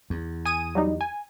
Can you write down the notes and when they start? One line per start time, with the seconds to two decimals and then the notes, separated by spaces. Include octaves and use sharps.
0.10 E2
0.45 G#5 D#6 D#7
0.75 F#3 G3 D#4
1.01 G#5